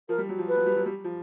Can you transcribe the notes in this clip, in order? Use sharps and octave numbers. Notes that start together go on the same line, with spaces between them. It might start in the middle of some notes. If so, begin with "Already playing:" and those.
F3 A#4
G3
F#3
F3
B4
F#3
G3
F#3
G3
F3